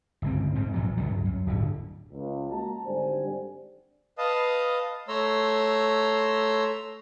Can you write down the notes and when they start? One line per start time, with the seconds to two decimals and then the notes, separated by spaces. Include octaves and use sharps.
0.22 G1 C#2 C4
0.55 G#2 C4
0.74 A#1 E2 F#3
0.98 C#2 G2 F#3
1.25 F#2
1.47 D1 G1 D3
2.12 C#2
2.51 G#3 A#3 F#4 A5 A#5
2.86 G#1 D3 G3 C5 G#5
4.18 B4 D#5 F5 A5 D#6
5.08 A3 C#5 A#5 C6 E6